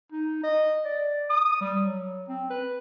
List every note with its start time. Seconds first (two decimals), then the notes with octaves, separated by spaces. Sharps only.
0.12 D#4
0.43 D#5
0.85 D5
1.30 D#6
1.61 G3
1.83 F#3
2.28 C4
2.50 B4